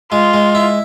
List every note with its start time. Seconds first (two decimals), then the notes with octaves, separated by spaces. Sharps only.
0.12 G#3 F4
0.33 G#3
0.55 E4